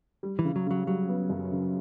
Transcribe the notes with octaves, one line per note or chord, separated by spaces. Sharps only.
G3
E3
C#3
F#3
C#3 F#3
F#3 G3
B3
F#2
C#3